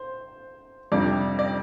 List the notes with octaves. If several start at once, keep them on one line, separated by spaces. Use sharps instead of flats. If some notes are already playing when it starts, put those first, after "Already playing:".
Already playing: C5
F2 C3 G3 D4 D5
D5